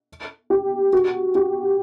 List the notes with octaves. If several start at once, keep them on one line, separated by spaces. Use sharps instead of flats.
G4
F#4
G4